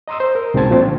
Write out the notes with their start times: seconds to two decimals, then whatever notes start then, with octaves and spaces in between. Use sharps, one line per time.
0.08 D#5 A#5 C6 D#6 E6
0.20 C5
0.35 A#4
0.54 C2 G#2 B2 C4 A5 G#6
0.69 A#2 F3 C4
0.82 D3